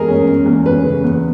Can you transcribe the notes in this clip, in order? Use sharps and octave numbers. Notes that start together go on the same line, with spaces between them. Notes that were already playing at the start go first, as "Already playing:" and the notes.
Already playing: E2 G#3 G#4 A#4
C#4
C#4
E2
C#4 B4
C#3
E2